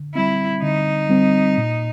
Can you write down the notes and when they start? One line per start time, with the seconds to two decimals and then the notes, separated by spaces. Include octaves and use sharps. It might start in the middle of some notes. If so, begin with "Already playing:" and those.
Already playing: D3
0.15 G3 C4 E4
0.62 D3 D#4
1.09 G3 C4
1.57 A#2